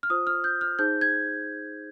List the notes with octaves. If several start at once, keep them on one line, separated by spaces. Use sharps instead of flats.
F6
F4 C5 D#6
F6
G6
F6
D#4 G#4 C5 G6
G#6